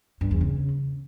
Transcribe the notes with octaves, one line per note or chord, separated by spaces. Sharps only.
G2
E2
C#3